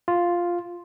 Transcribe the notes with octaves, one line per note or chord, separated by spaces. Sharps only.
F4